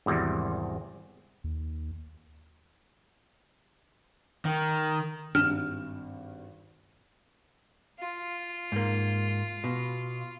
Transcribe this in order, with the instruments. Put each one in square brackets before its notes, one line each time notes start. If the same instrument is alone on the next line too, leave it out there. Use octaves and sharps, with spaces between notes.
[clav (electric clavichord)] G#1 E2 C3 G3
[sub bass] D#2
[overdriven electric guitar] D#3
[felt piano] G#1 G2 E7 [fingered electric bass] D4 [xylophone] F6
[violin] F4
[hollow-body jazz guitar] G#2 A#3
B2